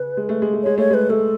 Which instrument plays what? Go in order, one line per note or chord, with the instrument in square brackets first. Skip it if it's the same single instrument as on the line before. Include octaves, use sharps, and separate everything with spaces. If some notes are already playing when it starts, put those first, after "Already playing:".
Already playing: [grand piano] C#3 [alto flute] B4
[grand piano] G#3
A3
G#3
A3
[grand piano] G#3 [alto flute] C#5
[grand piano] A3 [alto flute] C#5
[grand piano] G#3 [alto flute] B4
[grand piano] A3 [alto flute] A4